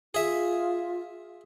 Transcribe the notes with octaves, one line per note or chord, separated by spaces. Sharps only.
F4 G#4 E5